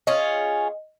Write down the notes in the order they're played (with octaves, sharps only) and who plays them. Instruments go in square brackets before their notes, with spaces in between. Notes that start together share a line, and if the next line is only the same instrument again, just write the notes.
[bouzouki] C#4 F4 G#4 [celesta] D#5